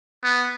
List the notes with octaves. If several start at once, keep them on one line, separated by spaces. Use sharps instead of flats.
B3